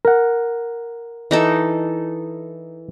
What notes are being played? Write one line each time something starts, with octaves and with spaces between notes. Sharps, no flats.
A#4 F#5
E3 D#4 A4